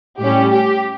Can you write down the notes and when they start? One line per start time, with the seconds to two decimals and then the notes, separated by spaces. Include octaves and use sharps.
0.20 A2 G3 C#4 G4
0.52 G4